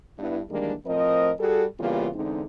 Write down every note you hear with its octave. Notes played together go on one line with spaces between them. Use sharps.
G2 B3 D4 E4
D#3 E3 G3 G#3 A#3 D4
A2 F3 C4 A#4 D#5
G3 F#4 G#4 A4
C#3 E3 G3 A#3 B3 F4
E2 D3 G#3 C4 D#4